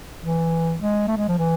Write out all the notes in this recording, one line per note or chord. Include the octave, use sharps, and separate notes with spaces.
E3
G#3
A3
G#3
F3
E3